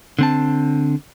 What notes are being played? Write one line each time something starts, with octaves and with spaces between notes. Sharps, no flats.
D3 C4 A5